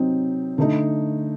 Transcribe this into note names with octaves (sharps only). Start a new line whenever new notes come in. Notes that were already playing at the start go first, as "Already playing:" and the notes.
Already playing: C3 F#3 C4 D#4
D3 A3 D#4